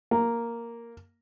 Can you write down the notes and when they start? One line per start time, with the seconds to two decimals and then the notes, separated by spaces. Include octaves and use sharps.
0.11 A#3